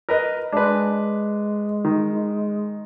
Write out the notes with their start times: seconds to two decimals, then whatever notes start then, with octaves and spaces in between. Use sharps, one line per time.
0.09 A#4 B4 D#5
0.52 G#3 D4 B4
1.85 D#3